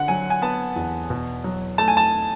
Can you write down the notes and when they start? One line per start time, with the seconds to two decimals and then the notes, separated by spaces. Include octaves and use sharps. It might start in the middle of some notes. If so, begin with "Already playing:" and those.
Already playing: D3 F#5
0.08 F#3 G#5
0.30 G#5
0.42 B3 A5
0.76 E2
1.10 B2
1.44 F#3
1.78 A3 A5
1.88 G#5
1.97 A5